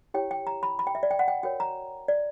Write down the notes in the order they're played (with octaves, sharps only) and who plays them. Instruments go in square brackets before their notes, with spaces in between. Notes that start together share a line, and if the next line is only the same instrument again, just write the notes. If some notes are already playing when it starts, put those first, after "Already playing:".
[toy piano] E4 G4 C#5 G5
G5
A#5
B5
B5
G5
E5
D5
G5
F#5
G5
F#4 A#4 C#5 G5
A#5
D5